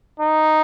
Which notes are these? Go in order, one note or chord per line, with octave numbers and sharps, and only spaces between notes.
D#4